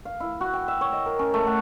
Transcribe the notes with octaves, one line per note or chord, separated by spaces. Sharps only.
F5
E4
F#4
G5
E5
C#5
D#5
A#4
C#4
A3
F#5